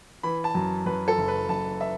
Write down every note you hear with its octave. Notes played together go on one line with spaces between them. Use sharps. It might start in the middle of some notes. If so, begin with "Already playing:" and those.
E3 B5
A5
F#2
F#2 B4
A4
F#1
B4
F#1 A5
E5